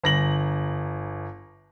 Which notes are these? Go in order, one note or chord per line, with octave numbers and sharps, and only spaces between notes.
G1 A#6 F#7